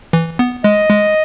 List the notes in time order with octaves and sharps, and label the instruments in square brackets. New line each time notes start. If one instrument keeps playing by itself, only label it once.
[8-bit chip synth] E3
B3
[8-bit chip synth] G#3 [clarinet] D#5
[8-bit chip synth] G#3